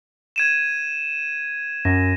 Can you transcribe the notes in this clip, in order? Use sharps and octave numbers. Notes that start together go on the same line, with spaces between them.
G#6 D#7 E7
F#2 A#6